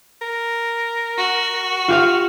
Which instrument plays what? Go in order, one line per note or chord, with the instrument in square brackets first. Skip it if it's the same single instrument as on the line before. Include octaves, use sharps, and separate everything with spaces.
[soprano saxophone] A#4
[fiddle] F#4
[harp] F4 G4 F5